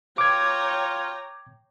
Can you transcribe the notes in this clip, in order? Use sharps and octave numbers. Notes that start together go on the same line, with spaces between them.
F4 C#5 G5 A#5 D6 G#6